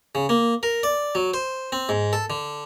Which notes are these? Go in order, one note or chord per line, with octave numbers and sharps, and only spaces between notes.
C#3
A#3
A#4
D5
F#3
C5
C4
G#2
A4
D3